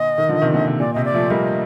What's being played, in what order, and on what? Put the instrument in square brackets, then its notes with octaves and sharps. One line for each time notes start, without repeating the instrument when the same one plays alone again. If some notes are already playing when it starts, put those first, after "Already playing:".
Already playing: [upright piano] A#2 D3 [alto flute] D#5
[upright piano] D#3
D3 F3
C3 D#3
A#2 D3
C3
[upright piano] A#2 [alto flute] D5
[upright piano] C3 [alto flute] D#5
[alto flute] D5
[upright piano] F3 A3
[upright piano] G3 A#3 [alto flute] D#5